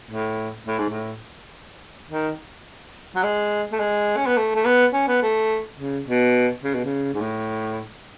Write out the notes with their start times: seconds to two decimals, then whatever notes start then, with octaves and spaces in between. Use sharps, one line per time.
0.11 A2
0.67 A2
0.79 G#2
0.90 A2
2.10 D#3
3.15 F#3
3.23 G#3
3.72 A3
3.80 G#3
4.17 C#4
4.26 B3
4.37 A3
4.55 A3
4.65 B3
4.93 C#4
5.08 B3
5.22 A3
5.79 C#3
6.07 B2
6.64 C#3
6.74 B2
6.85 C#3
7.14 G#2
7.21 A2